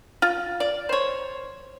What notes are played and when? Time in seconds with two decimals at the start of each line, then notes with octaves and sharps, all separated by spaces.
0.22 F4
0.60 D5
0.89 C5 C#5